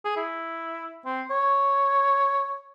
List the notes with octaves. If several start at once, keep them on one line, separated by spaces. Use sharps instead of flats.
G#4
E4
C4
C#5